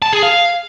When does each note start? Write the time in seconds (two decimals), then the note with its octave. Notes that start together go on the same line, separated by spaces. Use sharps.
0.02 A5
0.13 G#4
0.23 F5